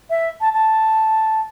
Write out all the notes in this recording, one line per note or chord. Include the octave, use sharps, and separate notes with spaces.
E5
A5
A5